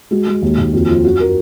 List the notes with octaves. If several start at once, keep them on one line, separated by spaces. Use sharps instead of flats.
G#3 F#4
G#3
D#2
D#2
F2 F#4
F3 F4
F#2 F#4
A#4